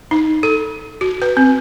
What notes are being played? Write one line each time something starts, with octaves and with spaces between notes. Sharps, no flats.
D#4
A4
F#4
B4
C4